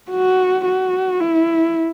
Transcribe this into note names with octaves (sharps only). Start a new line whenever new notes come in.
F#4
F#4
E4